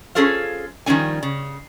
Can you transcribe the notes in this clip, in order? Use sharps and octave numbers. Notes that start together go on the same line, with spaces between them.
C#4 F4 G#4 A4 C5 F5
D#3 F3 G3 C#4 G#5
C#3